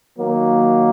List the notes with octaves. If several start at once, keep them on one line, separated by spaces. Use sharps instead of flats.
D#3 F#3 A#3